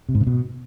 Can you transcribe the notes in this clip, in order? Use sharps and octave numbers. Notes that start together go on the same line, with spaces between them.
C3
G#2
C#3
B2